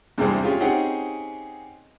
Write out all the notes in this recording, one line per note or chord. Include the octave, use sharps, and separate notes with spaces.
E2 G2 C3 G3 G#3 C4
C#4 F4 G4 G#4
C4 C#4 D#4 G4 G#4 F#5